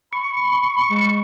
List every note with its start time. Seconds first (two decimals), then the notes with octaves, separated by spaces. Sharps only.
0.13 B5 C#6
0.90 G#3